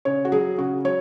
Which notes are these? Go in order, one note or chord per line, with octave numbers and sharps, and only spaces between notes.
C#3 C#5
F#4
F#3 G#4
C#3 F#4
F#3 C#5